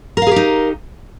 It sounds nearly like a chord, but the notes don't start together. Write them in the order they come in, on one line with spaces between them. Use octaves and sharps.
A#4 F5 G#4 G4 D#4